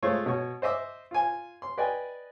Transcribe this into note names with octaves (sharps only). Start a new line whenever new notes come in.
G#3 A3 F4 C5 C#5
B2 C#5
C5 D#5 E5 D6
F4 G#5
C6
B4 D5 D#5 G5 G#5